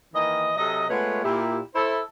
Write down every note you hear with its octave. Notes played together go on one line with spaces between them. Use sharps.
D#3 E3 A#3 D#5
C3 F#3 A4 D#5
G#3 A3 B3 F4 B4 C#5
A#2 E4 G4
E4 A4 C5